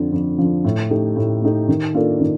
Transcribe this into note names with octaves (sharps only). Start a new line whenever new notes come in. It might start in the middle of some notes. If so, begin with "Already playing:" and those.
Already playing: F2 D3 F3
F2
D3 F3
A2
A3 D#4 G4
A2
A3 D#4 G4
D#3
A#3 D4 F4 A4
D#3